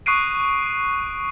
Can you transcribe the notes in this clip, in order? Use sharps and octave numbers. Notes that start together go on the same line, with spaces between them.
C#6 D#6 F#6 C7 D7 D#7